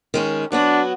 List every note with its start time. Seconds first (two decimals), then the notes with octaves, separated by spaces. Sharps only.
0.14 D#3 G#3 C#4
0.52 F#3 B3 D4 F#4